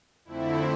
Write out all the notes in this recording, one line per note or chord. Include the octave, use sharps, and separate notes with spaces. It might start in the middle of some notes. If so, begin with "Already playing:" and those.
F2 D3 A3 C4 E4